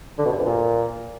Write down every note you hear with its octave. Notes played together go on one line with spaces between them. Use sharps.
D3
B2
G2
F2
A#2